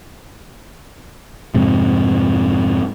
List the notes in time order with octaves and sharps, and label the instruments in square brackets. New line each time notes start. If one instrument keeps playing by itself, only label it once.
[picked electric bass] F2 G#2 C3